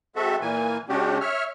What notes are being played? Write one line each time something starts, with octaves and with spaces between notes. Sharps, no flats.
G#3 C4 F#4 A4 E5
A#2 E3 A#3 G#5
C#3 G#3 C#4 D4 F#4 G4
C#5 E5 F6